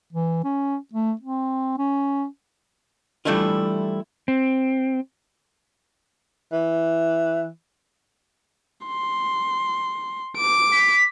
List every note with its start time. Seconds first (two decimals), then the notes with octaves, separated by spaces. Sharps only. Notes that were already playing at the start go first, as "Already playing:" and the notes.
0.13 E3
0.44 C#4
0.93 A3
1.21 C4
1.78 C#4
3.25 E3 G3 A3 D4 E4 F4
4.28 C4
6.52 E3
8.87 C6
10.37 D6 D7
10.72 B6